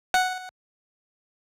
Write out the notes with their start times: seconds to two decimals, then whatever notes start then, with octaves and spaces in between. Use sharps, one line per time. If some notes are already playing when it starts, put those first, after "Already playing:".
0.14 F#5